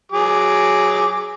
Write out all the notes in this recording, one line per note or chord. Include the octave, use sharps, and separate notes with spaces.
F#3 G#4 D6